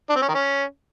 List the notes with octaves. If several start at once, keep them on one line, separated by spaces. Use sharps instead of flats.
D4
C4
C#4
D#3
C#4